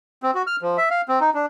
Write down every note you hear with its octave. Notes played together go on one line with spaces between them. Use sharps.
C4
F#4
F6
F3
E5
F5
C4
D#4
D4